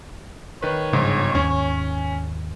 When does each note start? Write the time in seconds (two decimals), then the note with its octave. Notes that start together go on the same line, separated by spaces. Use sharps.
0.62 D#3 B4 C#5
0.93 G1 G#2 C#3 F3
1.35 D#2 G#2 C#4